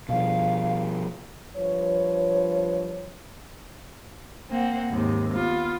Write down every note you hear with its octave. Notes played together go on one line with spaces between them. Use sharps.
B2 F3 F5
G2 F3 B4 C#5
A#3 C4 F#5
D#2 G#2 C3
B3 F4